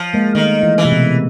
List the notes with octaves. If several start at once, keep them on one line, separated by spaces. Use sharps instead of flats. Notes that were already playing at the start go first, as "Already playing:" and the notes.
Already playing: F3
G#3 A#3
D#3 A3
E3
E3
C3
B2